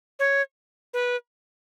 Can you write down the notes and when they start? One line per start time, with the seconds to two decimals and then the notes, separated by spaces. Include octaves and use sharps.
0.19 C#5
0.94 B4